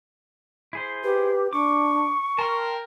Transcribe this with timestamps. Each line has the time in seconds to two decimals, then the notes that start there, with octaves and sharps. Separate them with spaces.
0.73 E4 G#4 C5
1.03 G4 B4
1.53 D4 C#6 D6
2.39 A#4 G5 A5 C6 F6